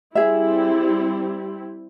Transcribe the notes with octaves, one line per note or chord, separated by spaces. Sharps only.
G3 C4 E4 G#4 E5